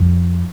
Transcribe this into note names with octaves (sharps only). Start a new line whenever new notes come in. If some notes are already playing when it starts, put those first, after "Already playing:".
Already playing: F2